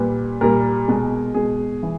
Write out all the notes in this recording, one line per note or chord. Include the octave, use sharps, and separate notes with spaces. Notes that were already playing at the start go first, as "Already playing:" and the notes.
Already playing: A#2 G3 B4
A#2 G3 A#4
B2 G#3
B2 G#3 G#4
E3